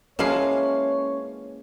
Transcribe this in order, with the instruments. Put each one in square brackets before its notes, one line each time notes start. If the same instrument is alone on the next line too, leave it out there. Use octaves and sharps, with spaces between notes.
[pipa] E3 F3 F5 [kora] G#3 A#3 [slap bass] C#4 [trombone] C#5